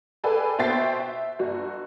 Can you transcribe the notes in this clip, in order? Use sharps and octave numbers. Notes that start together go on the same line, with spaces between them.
G#4 A4 B4 D5 G5 G#5
B2 C5 E5 G5 A6 C7
E5
G1 F#4